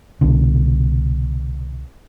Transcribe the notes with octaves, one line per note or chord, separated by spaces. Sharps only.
C2 B2 D3